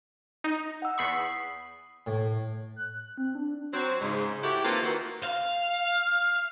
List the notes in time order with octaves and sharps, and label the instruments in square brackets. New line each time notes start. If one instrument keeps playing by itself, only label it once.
[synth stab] D#4
[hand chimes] F#5 E6
[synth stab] E2 B5 C#6 [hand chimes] D#6 C7
[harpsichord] A2
[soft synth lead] F#6
C4
D4
[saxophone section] F#3 C4
G#2 C#3
A3 E4 F#4 G4
D#3 A#3 C4 F4 A4 B4
D#3 E3 F#4
[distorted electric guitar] F5